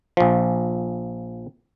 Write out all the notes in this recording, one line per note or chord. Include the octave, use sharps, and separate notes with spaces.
A#1 F3